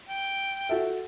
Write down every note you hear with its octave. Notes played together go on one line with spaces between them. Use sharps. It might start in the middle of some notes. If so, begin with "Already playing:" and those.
G5
F#4 A4 E5